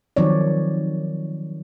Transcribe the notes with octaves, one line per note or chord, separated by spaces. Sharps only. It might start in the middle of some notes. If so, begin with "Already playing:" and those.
D#3 F3 F#3 C4 C#5 D5